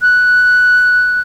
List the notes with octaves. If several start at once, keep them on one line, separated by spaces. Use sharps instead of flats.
F#6